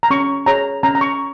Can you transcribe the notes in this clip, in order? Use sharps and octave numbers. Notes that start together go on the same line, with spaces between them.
A#5
C#4 C#6
G#4 C#5 A#5
C#4 A#5
A#5
C#6